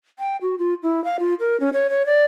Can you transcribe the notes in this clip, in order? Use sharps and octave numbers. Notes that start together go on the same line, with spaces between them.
G5
F#4
F4
E4
F5
F4
A#4
C#4
C#5
C#5
D5